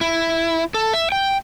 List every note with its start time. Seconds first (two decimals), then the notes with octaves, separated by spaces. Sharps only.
0.01 E4
0.74 A4
0.93 E5
1.12 G5